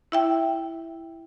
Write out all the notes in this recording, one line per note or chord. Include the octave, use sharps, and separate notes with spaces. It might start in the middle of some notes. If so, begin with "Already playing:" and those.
E4 E5 G5